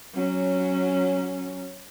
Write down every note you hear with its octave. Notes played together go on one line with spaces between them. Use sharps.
F#3 C#4